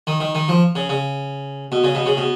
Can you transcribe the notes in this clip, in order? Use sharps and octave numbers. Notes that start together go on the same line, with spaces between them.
D#3
D#3
D#3
F3
C#3
C#3
B2
C#3
B2
C#3
B2